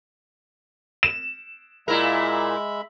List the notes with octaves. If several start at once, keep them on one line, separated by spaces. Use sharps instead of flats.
E7
A#2 G#3 E4 A#4 E5 B5